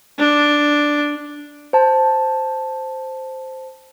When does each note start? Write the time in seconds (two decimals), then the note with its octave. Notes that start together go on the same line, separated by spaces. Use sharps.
0.19 D4
1.73 C5 A5